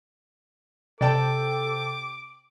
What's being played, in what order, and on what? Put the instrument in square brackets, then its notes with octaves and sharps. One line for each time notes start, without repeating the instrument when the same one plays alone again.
[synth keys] C3 G5 [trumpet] A4 [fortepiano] D5 A5 [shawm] D6